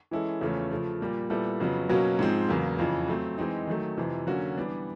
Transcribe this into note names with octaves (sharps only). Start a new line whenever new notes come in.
E3 G#3 C#4 E4 A4
E2 C#3 F3 A3 C#4
C#3 F3 A3
A#2 G3 A#3
A#2 G3 B3 E4 A4
F2 C#3 F#3 B3
B2 F#3 A#3 C#4 F#4
G#2 F3 G#3 C4
E2 C#3 F#3 A#3
F2 C#3 E3
F#3 A3 C4
E3 G#3 C4 D#4
D#3 F#3 A3
F2 C3 E3
D3 F#3 A#3 C#4 F#4
E3 G3 B3 D4